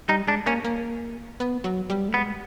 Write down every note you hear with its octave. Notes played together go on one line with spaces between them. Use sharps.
G3 D#4
G#3 D4
A#3 C#4
A#3
B3
F#3
G3
A3
G#3 B3